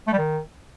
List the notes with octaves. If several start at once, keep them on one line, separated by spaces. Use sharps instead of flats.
A3
G3
D#3